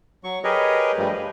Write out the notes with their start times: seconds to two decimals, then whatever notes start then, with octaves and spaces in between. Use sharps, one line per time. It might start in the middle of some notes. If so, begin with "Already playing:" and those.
0.24 F#3 C#6
0.44 G4 G#4 A#4 B4 C#5 D#5
0.98 G2 F3 G3 A3
1.13 B4